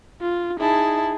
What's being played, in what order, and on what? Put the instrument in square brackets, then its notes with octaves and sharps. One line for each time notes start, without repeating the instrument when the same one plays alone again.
[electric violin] F4
[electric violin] D#4 G#4 [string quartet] E4 A5